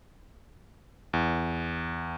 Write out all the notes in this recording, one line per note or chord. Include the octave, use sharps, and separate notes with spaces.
E2